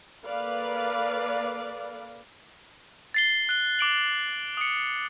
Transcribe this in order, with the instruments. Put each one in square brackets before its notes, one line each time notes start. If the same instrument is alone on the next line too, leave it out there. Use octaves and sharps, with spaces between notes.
[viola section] A#3 A4 B4 D5 F5
[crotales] A6 C7 G7
F#6 G7
D6 D7 F#7
D#6 C#7